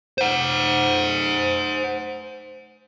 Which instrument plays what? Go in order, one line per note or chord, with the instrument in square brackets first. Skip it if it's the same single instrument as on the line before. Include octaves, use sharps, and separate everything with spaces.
[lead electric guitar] C5 F#5